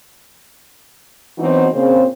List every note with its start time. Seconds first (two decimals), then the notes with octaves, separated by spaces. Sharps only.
1.38 E3 F#3 B3 C4 D#4 F#4
1.72 A#2 C#3 C4